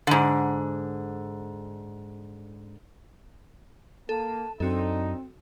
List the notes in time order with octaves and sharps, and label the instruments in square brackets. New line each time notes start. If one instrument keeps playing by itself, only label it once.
[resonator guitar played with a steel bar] G#2 D3
[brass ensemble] A#3 [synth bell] A4 [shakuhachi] A5
[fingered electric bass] F#2 [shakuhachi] C4 [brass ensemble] D4 D#4 [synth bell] F#4 A4